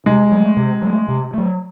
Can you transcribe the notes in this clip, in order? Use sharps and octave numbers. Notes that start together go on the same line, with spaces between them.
C3 G#3
F#3 A3
C3
F#3 A3
C3
F#3 A3